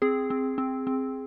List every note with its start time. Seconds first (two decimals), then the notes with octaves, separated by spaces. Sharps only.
0.02 C4 G#4
0.30 C4
0.58 C4
0.87 C4